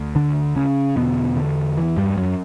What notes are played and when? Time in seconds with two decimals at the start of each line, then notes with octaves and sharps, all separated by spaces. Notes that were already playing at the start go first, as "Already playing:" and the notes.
Already playing: D2
0.16 D3 D4
0.56 C#3 C#4
0.96 E2 B2 D3 B3
1.37 D3
1.77 E3
1.97 G2 G3
2.17 F#2 F#3